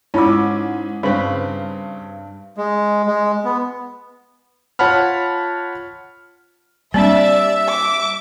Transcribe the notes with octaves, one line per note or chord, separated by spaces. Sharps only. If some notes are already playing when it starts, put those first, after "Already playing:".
G#2 C#4 E4 F4 A5 D6 E6
G2 C#3 C4 D4 B4 B5
G#3
G#3
B3
F4 C#5 F#5 A5 B5 F6
G3 A#3 C4 D4 D5 E5
D6